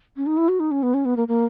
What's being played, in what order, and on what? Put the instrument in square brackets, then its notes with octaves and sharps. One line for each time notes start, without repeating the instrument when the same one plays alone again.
[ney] C#4
D#4
E4
F#4
D#4
C#4
B3
C#4
B3
A#3
A#3